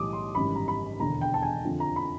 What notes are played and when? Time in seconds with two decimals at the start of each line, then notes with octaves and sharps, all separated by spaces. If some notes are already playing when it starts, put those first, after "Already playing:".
Already playing: B1 A2 E3 G3 D6 D#6
0.13 C6
0.35 G#1 F#2 C#3 E3 G3 B5
0.55 A#5
0.68 B5
1.00 E1 D#2 D3 A#5
1.21 G5
1.34 A5
1.42 G#5
1.65 F2 D3 F3
1.80 A#5
1.96 B5